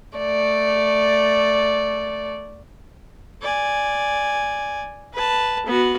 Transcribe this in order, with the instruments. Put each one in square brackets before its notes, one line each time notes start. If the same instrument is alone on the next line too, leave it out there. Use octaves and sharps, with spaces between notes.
[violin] A3 D5
[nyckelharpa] D5 G#5
B4 A5
B3 F#4